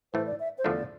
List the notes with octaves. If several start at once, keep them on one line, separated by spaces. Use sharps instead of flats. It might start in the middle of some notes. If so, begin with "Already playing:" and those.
A2 E3 A3 C5
D5
E5
C5
E2 D3 F3 A3 D4 D5